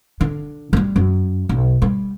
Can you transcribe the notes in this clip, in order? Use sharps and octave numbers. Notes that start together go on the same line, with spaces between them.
D3
F3 G3
F#2
B1
G3